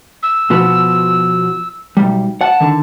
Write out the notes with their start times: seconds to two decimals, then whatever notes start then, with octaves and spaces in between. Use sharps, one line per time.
0.23 E6
0.50 B2 F3 B3
1.97 B1 G3
2.41 F#5 A5
2.60 D3 D#3